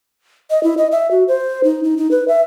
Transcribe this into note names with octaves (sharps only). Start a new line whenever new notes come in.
D#5
E4
D#5
E5
F#4
C5
D#4
D#4
D#4
B4
E5